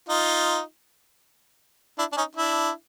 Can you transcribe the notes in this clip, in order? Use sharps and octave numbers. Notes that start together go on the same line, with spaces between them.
D#4 F4
D4 E4
D4
C#4 D#4
D4 E4